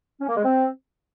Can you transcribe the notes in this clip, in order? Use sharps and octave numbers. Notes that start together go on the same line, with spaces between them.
C#4
A#3
G#3
C4